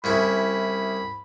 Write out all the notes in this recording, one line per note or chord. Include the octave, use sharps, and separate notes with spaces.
C2 C#3 E4 B5